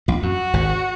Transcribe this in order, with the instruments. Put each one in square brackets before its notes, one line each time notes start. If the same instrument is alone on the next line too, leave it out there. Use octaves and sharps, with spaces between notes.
[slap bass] A#1 A#2
[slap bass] F#2 [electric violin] F#4
[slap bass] G#1 G#2